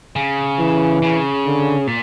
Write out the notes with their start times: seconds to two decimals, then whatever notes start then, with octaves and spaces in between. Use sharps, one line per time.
0.16 C#3
0.59 E3
1.02 C#3
1.45 D3
1.87 A#2